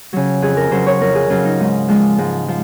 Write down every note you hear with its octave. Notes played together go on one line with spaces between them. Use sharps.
C#3 F#3
F2 G#4
A#4
C#3 F#3 C5
C#5
F2 A#4
G#4
C#3 F#3 F4
D#4
G#2
F3 G#3
G#2
F3